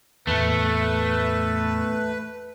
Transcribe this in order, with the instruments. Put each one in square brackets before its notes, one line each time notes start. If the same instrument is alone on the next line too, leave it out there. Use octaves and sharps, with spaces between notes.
[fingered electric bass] E2 A2 [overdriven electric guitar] A3 [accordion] B4